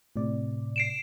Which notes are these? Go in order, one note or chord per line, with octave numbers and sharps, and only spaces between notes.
A2 C3 D5
C7 D7 E7